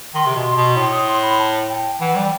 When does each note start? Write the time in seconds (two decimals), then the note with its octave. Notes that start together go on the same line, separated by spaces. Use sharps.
0.14 D#3 C6
0.26 C3
0.36 B2
0.46 C6
0.57 B2
0.77 A2 C6
0.92 D#6
1.08 C6
1.23 B5
1.39 A5
1.70 G5
2.00 E3 F#5
2.15 G3 G5